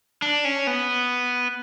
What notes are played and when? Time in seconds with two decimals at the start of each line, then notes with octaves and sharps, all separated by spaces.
0.22 D4
0.45 C#4
0.67 B3